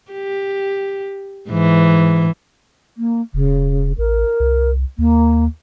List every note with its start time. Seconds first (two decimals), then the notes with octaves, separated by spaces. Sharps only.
0.12 G4
1.49 G#2 E3
2.97 A#3
3.34 E1 C#3
3.98 A1 A#4
4.40 C2
4.98 D#2 A#3